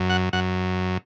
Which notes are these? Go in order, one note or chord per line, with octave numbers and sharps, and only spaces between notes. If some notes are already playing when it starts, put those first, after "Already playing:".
Already playing: F#2
F#5
F#2 F#5